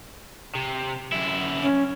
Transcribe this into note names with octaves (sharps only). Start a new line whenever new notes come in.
C3
F#2 E4
C#4